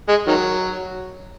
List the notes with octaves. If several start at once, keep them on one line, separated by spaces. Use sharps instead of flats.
G#3
D#3 F#3